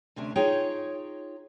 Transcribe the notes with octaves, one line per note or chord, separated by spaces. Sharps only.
D2 C3 C#4 D4
D#4 F4 G#4 C#5 G5